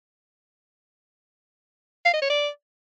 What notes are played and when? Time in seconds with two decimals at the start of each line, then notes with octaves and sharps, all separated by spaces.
2.05 F5
2.13 D#5
2.22 C#5
2.30 D5